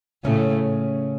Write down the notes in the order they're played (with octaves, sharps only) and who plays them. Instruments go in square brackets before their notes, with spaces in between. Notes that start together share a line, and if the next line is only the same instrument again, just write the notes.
[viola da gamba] A2 A3 [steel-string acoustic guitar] C#3 C#4